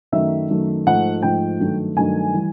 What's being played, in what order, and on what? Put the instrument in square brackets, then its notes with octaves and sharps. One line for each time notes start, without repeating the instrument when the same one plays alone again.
[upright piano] F#2 D#3 F#3 A3 E5
F#2 D#3 F#3 A3
G#2 F3 A3 F#5
G#2 F3 A3 G5
G2 D#3 F#3 A3
G2 D#3 F#3 A3 G#5
E3 G3